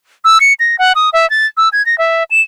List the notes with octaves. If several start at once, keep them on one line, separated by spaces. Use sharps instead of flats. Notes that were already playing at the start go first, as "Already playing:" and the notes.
E6
C#7
A#6
F#5
D#6
E5
A6
E6
G#6
A#6
E5
E7